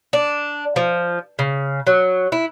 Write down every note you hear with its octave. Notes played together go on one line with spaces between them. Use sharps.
D4
F3
C#3
F#3
E4